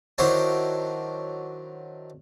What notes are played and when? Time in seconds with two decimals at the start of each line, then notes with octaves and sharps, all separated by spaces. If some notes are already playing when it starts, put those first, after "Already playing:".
0.18 D#3 F#3 D4 E4 C5 C#5